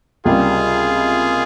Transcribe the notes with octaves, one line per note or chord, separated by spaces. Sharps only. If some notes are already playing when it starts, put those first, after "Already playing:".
C#2 C3 G3 A#3 F4 G#4